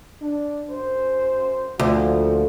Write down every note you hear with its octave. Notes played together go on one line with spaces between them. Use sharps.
D4
F#2 C5
D2 A#2 F3